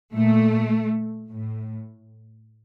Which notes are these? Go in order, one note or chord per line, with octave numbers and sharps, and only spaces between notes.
A#2 A3
A2